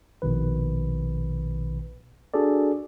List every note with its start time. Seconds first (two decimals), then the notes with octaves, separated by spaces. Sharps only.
0.22 A#1 B2 D#3 B4
2.34 D4 F#4 G#4 A4 D5